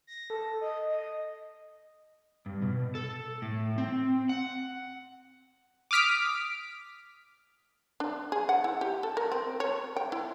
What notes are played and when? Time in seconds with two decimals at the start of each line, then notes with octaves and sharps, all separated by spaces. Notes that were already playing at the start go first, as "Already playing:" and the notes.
0.07 A#6
0.30 A4
0.61 D#5
0.89 D#5
2.46 G2
2.62 B2
2.95 A4
3.42 A2
3.78 C4
4.29 F#5
5.91 D6 D#6 F6 B6 D7
8.00 D4
8.32 G#4
8.49 F#5
8.64 E4
8.81 G4
9.03 A4
9.17 A#4
9.32 C4
9.60 C#5
9.96 G5
10.12 E4